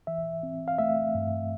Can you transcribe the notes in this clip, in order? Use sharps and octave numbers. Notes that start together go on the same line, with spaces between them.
E3 E5
C4
F5
A3 E5
G2